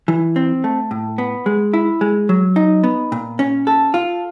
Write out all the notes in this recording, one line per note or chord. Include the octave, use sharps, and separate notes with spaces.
E3
C4
A3
A2
B3
G#3
E4
G#3
F#3
D#4
B3
A#2
C#4
A4
F4